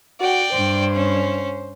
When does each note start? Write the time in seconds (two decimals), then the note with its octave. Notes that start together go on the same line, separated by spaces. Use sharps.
0.20 F#4 D5 G5
0.52 G2 C5
0.94 C#4